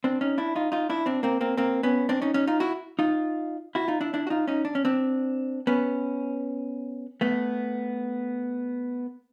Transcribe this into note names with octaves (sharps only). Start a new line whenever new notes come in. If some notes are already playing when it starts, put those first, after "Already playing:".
C4 D4
C#4 D#4
D4 E4
D#4 F4
D#4 F4
D4 E4
C4 D4
A#3 C4
A#3 C4
A#3 C4
B3 C#4
C4 D4
C#4 D#4
C#4 D#4
D#4 F4
E4 F#4
D#4 F4
E4 F#4
D#4 F4
D4 E4
D4 E4
F#4
D#4 F4
C#4 D#4
D4
C#4
C4 D4
B3 C#4
A3 B3